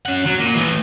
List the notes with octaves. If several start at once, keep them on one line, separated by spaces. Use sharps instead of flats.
C#4 F#5
F#3
A#2
A2 E3